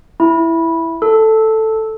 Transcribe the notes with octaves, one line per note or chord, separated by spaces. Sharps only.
E4
A4